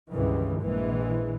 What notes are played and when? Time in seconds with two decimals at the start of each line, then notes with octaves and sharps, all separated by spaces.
0.12 C#2 G2 D#3 E3
0.61 A#1 E3 G#3